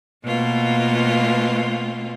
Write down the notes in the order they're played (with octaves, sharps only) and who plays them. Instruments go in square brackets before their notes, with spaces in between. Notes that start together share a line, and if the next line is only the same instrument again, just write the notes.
[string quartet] B2 A3 A#3 C4 F4